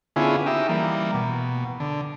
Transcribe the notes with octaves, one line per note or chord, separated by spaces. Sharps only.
D3 B3 C#4 E4 F4 G#4
D#4 G4 E5
E3 G3 A#3
B2
D3